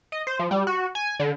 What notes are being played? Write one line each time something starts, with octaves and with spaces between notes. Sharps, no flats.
D#5
C5
F3
G3
F#4
G#5
D3